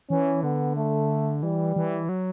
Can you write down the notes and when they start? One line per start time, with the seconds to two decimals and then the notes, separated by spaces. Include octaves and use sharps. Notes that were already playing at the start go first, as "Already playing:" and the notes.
0.10 E3 C#4
0.43 D3 B3
0.76 A3
1.43 E3 G3
1.76 E3
2.09 F#3